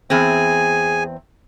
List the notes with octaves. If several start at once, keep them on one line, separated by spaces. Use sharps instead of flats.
E2 C4 G#4 G#5